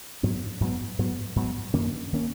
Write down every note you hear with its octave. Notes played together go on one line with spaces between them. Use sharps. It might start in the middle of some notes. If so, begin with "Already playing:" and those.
G#2 F#3 B3
G#2 F#3 B3
G#2 F#3 B3
G#2 F#3 B3
F#2 D#3 A#3 C#4
D#3 A#3 C#4